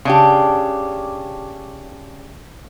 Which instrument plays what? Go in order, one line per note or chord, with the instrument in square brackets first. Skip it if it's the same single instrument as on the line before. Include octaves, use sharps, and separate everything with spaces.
[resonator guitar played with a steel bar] C#3 D4 G4